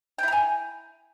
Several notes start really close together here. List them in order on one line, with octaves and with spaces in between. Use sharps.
G5 E4 A#5 G#5